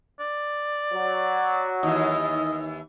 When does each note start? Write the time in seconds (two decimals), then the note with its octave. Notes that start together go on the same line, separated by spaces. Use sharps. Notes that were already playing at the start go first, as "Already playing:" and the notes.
0.20 D5
0.93 F#3
1.83 D#2 E3 D#5